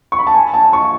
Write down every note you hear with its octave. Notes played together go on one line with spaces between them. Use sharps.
C#6
B5
A5
G#5
A5
C#6